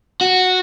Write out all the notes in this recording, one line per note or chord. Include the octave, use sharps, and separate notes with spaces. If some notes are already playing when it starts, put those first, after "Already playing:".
F#4